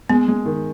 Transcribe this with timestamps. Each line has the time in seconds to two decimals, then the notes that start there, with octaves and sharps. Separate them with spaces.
0.09 G#3 B3
0.28 G#3
0.45 D#3